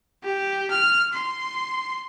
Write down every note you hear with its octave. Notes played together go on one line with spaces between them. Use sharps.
G4
F6
C6